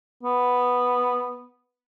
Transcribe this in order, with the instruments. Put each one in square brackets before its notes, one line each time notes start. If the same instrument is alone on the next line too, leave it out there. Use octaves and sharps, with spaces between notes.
[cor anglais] B3